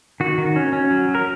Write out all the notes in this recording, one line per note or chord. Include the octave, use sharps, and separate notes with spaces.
D#3 F#4
D#3
C#4
C#4
F#3
F#3
A#4